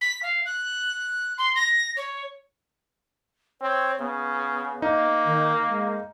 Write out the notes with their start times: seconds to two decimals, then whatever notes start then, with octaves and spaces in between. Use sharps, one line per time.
0.01 B6
0.22 F5
0.45 F#6
1.38 C6
1.55 A#6
1.96 C#5
3.61 C4 C#5
4.00 C#3 B3
4.82 A#3 D#4
5.25 D#3
5.68 G#3